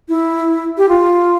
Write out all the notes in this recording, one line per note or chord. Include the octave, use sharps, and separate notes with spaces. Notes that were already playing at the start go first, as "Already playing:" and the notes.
E4
G4
F4